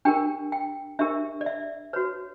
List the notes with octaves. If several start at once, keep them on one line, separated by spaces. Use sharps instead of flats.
D4 G4 A#4 G5
G5
D4 G4 A#4 E5
D5
E5
F#4 B4 C#5